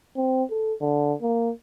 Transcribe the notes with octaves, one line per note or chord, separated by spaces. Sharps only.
C4
A4
D3
A#3